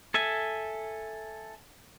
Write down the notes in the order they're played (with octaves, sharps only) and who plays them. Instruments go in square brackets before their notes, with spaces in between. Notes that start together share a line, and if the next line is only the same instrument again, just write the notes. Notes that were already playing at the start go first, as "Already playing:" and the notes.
[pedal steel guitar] A4 E5 G#5